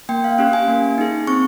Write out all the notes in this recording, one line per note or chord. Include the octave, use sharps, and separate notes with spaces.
A#3 G5
F5
C#4 G4 F5
G#5
A#3
D#4 G#4
C4 C#6